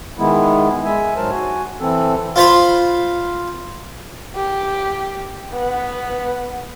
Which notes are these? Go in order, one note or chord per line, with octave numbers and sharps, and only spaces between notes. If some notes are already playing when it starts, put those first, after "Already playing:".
D#3 G#3 B3 E4
G#3 E5 G#5
G#2 F#3 A#4 C5 A5
F#4 G#5
E3 C4 A4
F4 C5 F5 B5 C6
G4
B3